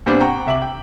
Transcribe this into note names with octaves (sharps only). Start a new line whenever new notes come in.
A#2 G3 B3 C4 D4
F#5 G5 A#5 C#6
C2 E5 D6 F#7
G5